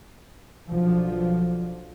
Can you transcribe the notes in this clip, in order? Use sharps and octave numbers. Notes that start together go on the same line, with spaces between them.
B1 D3 F3